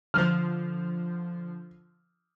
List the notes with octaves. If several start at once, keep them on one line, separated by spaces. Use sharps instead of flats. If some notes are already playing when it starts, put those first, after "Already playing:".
D3 F3 C5 F6